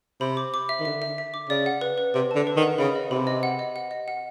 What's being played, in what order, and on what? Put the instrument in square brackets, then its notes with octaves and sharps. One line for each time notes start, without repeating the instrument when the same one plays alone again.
[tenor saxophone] C3 [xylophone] B5
[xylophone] D6
D6
E5
[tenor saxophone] D#3
[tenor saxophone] D3 [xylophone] E5
[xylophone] E5
E5
D6
[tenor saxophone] C#3 [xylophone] D5
[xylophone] F#5
B4
B4
[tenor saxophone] C3 [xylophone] B4
[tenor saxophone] D3 [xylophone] A5
[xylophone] B4
[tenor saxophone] D#3
[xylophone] F#5
[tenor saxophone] C#3 [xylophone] B5
[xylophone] D#5
[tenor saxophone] C3 [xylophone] B5
[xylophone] D#5
F#5
D#5
F#5
D#5
F#5